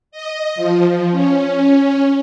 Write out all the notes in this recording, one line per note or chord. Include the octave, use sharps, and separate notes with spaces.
D#5
F3
C#4